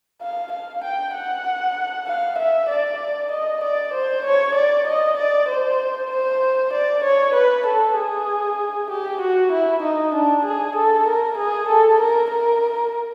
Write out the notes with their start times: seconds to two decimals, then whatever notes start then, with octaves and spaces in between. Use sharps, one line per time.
0.22 F5
0.52 F5
0.84 G5
1.15 F#5
2.07 F5
2.38 E5
2.69 D5
3.31 D#5
3.63 D5
3.94 C5
4.25 C#5
4.55 D5
4.87 D#5
5.17 D5
5.49 C5
6.11 C5
6.73 D5
7.04 C#5
7.34 B4
7.66 A4
7.96 G#4
8.90 G4
9.21 F#4
9.52 E4
9.82 D#4
10.14 D4
10.44 G#4
10.75 A4
11.07 A#4
11.37 G#4
11.68 A4
12.00 A#4
12.31 A#4